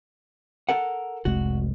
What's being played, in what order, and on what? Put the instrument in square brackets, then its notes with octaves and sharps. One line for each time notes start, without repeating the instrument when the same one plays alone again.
[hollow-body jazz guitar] A4 A#4 F#5
[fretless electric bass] F1 C2 G#3 [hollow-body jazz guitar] F#4